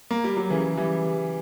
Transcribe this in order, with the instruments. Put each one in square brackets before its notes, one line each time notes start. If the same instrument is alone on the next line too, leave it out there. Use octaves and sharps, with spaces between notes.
[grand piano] A#3
G3
F#3
C#3 E3
E3 G3